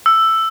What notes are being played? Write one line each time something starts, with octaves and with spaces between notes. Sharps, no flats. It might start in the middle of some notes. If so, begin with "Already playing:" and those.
E6